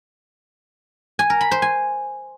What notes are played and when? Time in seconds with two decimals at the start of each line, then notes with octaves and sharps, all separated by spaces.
1.19 G#5
1.30 A#4
1.41 B5
1.51 C5
1.62 G#5